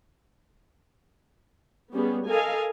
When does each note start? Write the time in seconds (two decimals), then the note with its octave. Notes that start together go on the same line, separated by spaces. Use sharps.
1.93 G3 B3 C#4 G#4
2.28 A4 A#4 D#5 F5 G#5